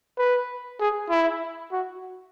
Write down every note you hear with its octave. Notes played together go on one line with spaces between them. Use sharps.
B4
G#4
E4
F#4